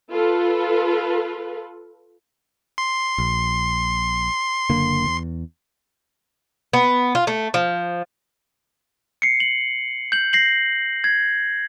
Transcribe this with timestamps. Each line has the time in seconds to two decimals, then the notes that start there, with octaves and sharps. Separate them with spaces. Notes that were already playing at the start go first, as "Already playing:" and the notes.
0.12 F4 A4 B4
2.78 C6
3.18 A#1
4.70 F#1 D3 A#3
5.05 E2
6.73 B3
7.15 F4
7.27 A3
7.54 F3
9.22 C7 C#7
9.40 F#7
10.12 G6 F#7
10.33 A#6 C7 F#7
11.04 G#6